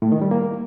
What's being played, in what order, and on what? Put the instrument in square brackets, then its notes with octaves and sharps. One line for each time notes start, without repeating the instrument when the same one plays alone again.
[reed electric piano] A2
D#3
G3
A#3